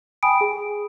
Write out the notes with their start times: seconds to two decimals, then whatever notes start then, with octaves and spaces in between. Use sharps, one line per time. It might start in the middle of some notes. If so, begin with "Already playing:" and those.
0.23 G5 G#5 B5 D#6 D7
0.41 G#4